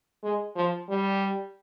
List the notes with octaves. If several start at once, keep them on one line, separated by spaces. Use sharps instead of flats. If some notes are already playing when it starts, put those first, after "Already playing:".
G#3
F3
G3